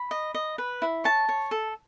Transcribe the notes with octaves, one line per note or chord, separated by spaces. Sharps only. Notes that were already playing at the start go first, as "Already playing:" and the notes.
Already playing: B5
D#5
D#5
B4
E4
C#5 A5
C#5
A4